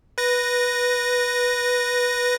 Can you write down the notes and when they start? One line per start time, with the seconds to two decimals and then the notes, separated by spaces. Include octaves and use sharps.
0.18 B4 A#6